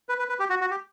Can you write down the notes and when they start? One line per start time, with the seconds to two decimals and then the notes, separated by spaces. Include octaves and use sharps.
0.09 B4
0.19 B4
0.29 B4
0.40 G4
0.50 F#4
0.61 F#4
0.71 G4